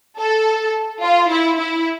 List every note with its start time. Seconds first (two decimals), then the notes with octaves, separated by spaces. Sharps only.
0.18 A4
1.02 F4
1.31 E4
1.58 E4